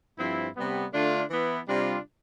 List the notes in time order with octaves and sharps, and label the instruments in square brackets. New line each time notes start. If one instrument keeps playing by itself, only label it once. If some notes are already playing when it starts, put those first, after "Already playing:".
[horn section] G2 F3 C4 E4
C3 G3 B3
D3 A3 D4 F4
E3 B3 E4
C3 G3 D4 F4